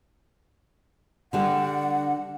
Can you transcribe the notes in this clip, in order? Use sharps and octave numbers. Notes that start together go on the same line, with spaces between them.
D3 G3 D4 F#5